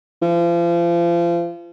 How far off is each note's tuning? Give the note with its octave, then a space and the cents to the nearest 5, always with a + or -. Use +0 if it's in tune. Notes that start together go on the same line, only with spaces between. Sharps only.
F3 -35